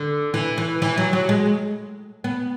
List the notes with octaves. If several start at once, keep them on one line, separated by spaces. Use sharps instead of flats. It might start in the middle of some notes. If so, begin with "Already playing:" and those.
Already playing: D3
E3
E3
E3
F#3
F#3
G#3
B3